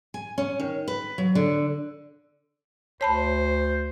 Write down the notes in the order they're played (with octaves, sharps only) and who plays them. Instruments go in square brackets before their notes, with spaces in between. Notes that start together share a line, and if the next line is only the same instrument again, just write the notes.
[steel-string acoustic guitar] G#5
C#4
D#3
B4
F#3
D3
[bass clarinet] D2 [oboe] C5 [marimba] C#5 A5 B5